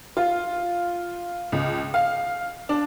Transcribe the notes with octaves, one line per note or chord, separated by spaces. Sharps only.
F4
C#2
F5
D4